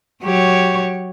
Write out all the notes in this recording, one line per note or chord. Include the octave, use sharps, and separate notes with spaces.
F#3 G4 C#5